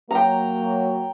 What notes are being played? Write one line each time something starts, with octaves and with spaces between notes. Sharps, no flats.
F#3 A#3 G5 A#5